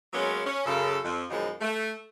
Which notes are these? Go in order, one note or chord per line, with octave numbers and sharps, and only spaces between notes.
F#3 G#3 A#3 B3 C#4
C#4
F#2 C#3 A4
F2
F#2 B2 D#3 F3 F#3 G#3
A3